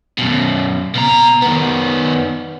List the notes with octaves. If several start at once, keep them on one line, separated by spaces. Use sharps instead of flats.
F#2 B2
B2 A#5
D#3 B3